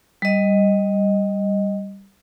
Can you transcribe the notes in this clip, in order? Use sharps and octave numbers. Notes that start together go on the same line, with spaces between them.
G3 D#5